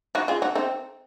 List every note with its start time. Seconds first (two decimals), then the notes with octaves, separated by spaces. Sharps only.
0.15 D#4 F#4
0.28 F4 G#4
0.42 D#4 F#4
0.55 C4 D#4